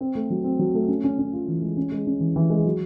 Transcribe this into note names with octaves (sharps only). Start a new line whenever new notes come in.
C4
A3
F#3
C4
F#3
A3
C#4
C#4
C#4
F4
E3
G#3
C#4
G#3
C#4
E3
E3
G#3
F#3